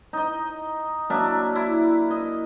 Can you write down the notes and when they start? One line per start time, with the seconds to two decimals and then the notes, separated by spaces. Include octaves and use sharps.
0.13 D#4 D#5
1.10 F#3 A#3 D4 E5
1.56 E4
2.10 D#5